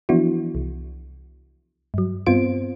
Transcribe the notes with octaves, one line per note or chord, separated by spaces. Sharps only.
E3 F3 B3 D4 E4 F#4
C2
G2 F#3
G2 B3 C4 F4 C5 D7